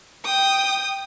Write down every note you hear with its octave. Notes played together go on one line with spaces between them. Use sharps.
G5 D#6